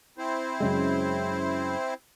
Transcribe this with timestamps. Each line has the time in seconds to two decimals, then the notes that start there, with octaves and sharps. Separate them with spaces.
0.18 C4 E4 C5
0.60 F#2 C#3 G#3